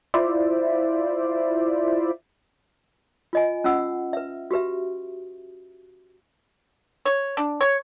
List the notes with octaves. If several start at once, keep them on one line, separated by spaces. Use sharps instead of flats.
E4 F4 C5 D5 E5
F4 D#5 G#5
C#4 F4 F#5 E6
B4 E5
F#4 G4 B4 E5
C#5
D4
C#5